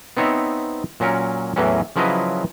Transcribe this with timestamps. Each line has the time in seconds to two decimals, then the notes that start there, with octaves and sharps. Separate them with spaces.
0.17 B3 C4 D#4 C#5 E5
1.00 A#2 F#3 C#4 A#4
1.56 E2 A2 E3 F#3 C#4
1.96 C#3 F3 F#3 E4 B4 D#5